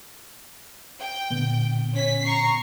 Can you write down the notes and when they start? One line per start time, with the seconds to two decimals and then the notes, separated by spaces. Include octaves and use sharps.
1.00 G5
1.30 A#2 D3 B3
1.94 C#4 B6
2.24 A#5 C#6 C7